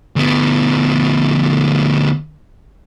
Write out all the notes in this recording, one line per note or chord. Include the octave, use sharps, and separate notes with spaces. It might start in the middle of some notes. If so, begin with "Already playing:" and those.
D2 B3